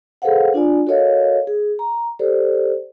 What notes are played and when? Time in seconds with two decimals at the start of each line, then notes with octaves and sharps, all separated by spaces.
0.22 G#4 A4 B4 C5 F5 F#5
0.54 D4 F4 D5 G#5
0.87 F#4 A4 A#4 C#5 D#5 F5
1.47 G#4
1.79 A#5
2.19 G4 A4 C5 D5